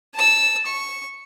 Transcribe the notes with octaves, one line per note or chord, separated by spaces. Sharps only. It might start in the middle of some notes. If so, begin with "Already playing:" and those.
A5 E6
C#6